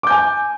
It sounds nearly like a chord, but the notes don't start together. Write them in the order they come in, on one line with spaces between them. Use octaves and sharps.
D6 G6 G#5